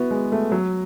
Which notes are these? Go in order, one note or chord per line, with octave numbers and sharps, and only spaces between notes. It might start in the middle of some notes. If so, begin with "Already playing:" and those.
Already playing: B3 E4 F#4
G#3
A3
F#3